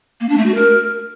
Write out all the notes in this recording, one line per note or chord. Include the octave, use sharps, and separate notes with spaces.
A#3
D4
A3
F#4
A#4